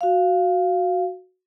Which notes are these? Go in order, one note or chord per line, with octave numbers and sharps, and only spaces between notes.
F#4 F5